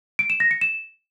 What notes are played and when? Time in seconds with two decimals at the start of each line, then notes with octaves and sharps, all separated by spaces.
0.19 D7
0.30 E7
0.40 A#6
0.51 C#7
0.61 E7